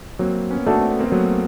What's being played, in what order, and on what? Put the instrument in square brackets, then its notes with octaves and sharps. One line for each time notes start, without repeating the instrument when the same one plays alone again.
[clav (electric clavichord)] F#3 [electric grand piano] A#3 C4
[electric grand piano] B3 C#4
[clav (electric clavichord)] A3 D4 F#4 A4
[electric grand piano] C4
B3
A#3 C4
[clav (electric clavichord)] F#3 [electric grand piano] A3 B3